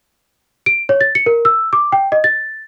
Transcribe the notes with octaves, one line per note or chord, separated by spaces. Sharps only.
D7
C#5
A6
C#7
A#4
E6
D6
G5
D#5
A6